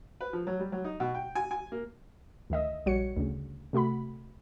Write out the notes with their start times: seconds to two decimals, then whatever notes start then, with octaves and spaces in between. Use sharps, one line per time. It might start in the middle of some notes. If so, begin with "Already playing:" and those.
0.21 B4
0.33 F3
0.47 F#3
0.60 G3
0.72 F#3
0.85 D#4
1.00 B2
1.15 G5
1.35 G#5
1.51 G#5
1.72 A#3
2.50 D2 D#3 D#5 E5
2.86 A#1 G3 F#4 C#5 C#7
3.17 D2 C#3
3.73 C3 A3 F#4 B5